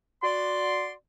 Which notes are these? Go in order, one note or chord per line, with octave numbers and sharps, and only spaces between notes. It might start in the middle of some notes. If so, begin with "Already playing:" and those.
F#4 D5 C6